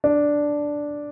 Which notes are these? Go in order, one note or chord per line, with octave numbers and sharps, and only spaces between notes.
D4